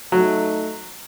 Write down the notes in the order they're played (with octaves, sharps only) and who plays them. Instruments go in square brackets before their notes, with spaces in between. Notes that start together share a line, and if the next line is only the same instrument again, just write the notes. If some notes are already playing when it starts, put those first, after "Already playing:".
[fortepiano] F#3 [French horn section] A3 D#4